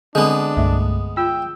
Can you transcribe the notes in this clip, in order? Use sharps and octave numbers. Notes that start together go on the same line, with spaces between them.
D3 G#3 B3 C4 D4
C2 G2 A3 E5
F4 G5 E6